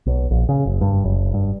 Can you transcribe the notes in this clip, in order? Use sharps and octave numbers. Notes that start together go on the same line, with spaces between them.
B1
A#1
C#3
F#1
G2
F#1
G2